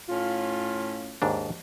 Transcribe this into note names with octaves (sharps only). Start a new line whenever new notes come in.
A2 C#4 F4
D#2 G#2 D4